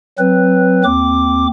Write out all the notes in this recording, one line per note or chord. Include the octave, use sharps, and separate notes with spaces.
F#3 C4 B4
D#2 C4 D6